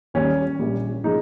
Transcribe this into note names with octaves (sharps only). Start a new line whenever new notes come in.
D#2 D#3 G3 C#4
A#1 A#2 G3
C#3 F3 G#3 D#4